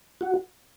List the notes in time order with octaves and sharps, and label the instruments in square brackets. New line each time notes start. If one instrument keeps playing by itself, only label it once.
[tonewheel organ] F#4